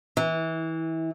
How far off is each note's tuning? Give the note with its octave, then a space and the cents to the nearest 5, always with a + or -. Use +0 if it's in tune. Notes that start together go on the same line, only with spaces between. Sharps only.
E3 -25